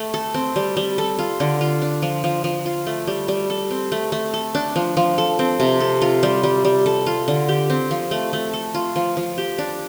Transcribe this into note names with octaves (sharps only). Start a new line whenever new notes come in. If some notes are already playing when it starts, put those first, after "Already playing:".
Already playing: A3
A4
C4
G3
G3
A4
F4
D3
F4
D4
F3
F3
F3
F4
A3
G3
G3
A4
C4
A3
A3
A4
D4
F3
F3
A4
C4
C3
A4
F4
G3
G3
G3
A4
F4
D3
G4
C4
F3
A3
A3
A4
F4
F3
F3
G4
D4